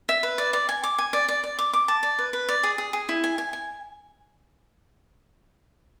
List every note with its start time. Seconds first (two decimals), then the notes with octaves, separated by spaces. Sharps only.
0.09 E5
0.23 B4
0.38 D5
0.53 D5
0.69 G#5
0.84 D6
0.98 G#5
1.13 D5
1.28 D5
1.44 D5
1.59 D6
1.73 D6
1.88 A5
2.03 D5
2.19 B4
2.33 B4
2.49 D5
2.63 G#4
2.78 G#4
2.93 G#4
3.09 E4
3.24 G#5
3.38 G#5
3.53 G#5